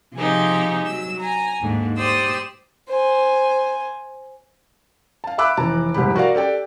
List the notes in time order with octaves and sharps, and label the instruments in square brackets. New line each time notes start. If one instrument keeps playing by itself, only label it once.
[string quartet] C3 F3 C4 D#4 G4 G#4
F#3 E6
G#5 A#5
D#2 G#2 D3
G4 C5 D5 D#6 E6
[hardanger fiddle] C5 G#5
[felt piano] F5 A5
E5 F5 B5 D6 E6 F#6
F1 E3 A5 A#5
F1 C2 G#2 G4 B5
F#4 A#4 D5 F5
G4 A4 D5 G5